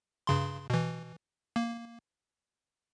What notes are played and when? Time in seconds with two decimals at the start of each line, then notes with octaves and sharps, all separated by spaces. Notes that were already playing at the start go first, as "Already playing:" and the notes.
0.27 G2 C#3 C6
0.70 B2 E3
1.56 A#3